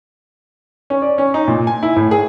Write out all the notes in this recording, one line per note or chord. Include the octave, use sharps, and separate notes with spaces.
C#4
D5
C#4
D#4
A#2
G#5
E4
A2
G#4